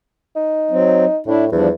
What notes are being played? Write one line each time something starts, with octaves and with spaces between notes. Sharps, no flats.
D#4
F#3 C4
A2 D4 E4
E2 F3 G3 D4